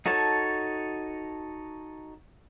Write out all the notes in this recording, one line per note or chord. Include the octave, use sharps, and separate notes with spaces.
D#4 F#4 A4 C#5 A5